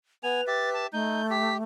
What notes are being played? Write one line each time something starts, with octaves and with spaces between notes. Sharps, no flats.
B3 B4 G#5 F7
G4 E5 A6
A5
A3 D#4 G6
G4 B6